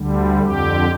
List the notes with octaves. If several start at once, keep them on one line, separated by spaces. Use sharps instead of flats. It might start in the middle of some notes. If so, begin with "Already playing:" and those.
Already playing: D2 D3 G3
F2 D3 G4